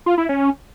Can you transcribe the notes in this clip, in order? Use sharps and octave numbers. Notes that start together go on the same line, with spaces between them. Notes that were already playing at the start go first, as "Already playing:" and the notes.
F4
E4
C#4